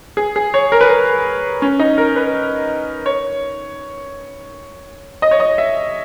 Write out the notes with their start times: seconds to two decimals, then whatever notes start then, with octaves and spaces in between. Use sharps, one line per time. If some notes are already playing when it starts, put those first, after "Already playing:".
0.17 G#4
0.36 G#4
0.54 C#5
0.72 A#4
0.81 B4
0.89 A#4
1.62 C#4
1.79 D#4
1.98 A#4
2.16 B4
3.06 C#5
5.22 D#5
5.31 C#5
5.40 D#5
5.58 E5